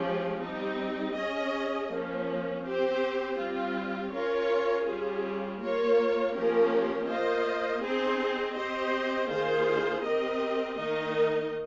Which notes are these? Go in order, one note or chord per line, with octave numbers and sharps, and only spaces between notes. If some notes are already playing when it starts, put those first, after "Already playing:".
Already playing: F3 G#3 C#4 G4
G3 C4 D#4
C#4 G#4 D#5
F3 A#3 C#4
C4 G4 C5
G3 C4 F4
C#4 F4 A#4 C#5
G3 C#4 F4 G#4
A#3 F4 A#4 C#5
F3 A#3 C#4 G4 A#4
A#3 F4 C5 D#5
C4 D#4 G#4 C5
C4 G4 C5 D#5
D#3 A#3 F4 G#4 C5
C4 G4 A#4 D#5
D#3 A#3 D#4 A#4 D#5